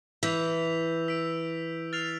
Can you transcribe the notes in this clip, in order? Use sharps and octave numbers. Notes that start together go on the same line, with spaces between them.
E3 E6 G6 B6 F7
E6 B6 D7
F6 A6 C7 F7